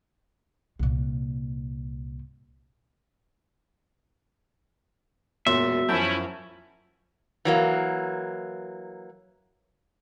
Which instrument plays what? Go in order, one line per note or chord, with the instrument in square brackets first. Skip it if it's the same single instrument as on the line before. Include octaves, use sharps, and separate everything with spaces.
[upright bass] C2 A#2
[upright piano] E1 A#2 C6 [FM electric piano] B3 F#4 C#5 [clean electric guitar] E5
[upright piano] F#2 F3 [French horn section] C#4 E4 [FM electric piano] A5 G6
[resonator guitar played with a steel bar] E3 F#3 A#3